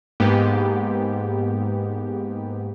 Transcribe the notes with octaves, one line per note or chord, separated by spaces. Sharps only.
G#2 A#3 B3 G4